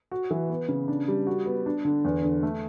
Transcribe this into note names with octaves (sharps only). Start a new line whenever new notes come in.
F#4
E3
B3
C#3
D4
G3
F#4
B3
D4
D3
E2
D3
A3